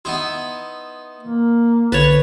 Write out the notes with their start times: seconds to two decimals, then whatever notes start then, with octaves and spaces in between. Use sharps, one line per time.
0.05 B3 D#4 E4 C6
1.21 A#3
1.92 B1 D3 B4 C#5 A5